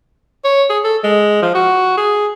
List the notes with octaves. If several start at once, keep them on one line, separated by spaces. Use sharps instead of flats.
C#5
G#4
A4
G#3
F3
F#4
G#4